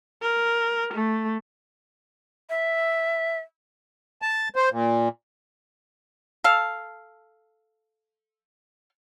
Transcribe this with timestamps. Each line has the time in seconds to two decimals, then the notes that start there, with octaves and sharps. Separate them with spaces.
0.22 A#4
0.94 A3
2.50 E5
4.22 A5
4.56 C5
4.71 A#2
6.44 A4 F5